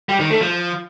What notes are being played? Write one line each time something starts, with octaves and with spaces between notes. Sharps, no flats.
G3
D#3
A3
F3